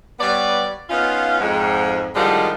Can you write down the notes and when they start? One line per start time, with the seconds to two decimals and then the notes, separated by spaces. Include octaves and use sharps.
0.20 G3 B3 B4 C#5 D5
0.90 B3 C#4 D#4 F4
1.40 F2 G#2
2.15 A2 D3 D#3 F3 G3 G#3